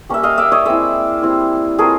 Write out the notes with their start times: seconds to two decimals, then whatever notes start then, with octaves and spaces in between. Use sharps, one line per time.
0.09 G3 A#3 C#4 E5
0.23 D#5 F5
0.38 D5 E5
0.52 C#5 D#5
0.66 G#3 C4 E4 D5 E5
1.22 G3 C4 E4
1.78 A3 C4 F4 G#4 A#4